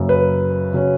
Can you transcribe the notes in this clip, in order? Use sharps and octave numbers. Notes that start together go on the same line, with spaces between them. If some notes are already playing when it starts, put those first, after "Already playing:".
Already playing: F#1 F#2 C#3
B4
C#3 F#3 C#4